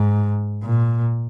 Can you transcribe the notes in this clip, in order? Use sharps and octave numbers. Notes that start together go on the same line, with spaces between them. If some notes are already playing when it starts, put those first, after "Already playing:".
Already playing: G#2
A#2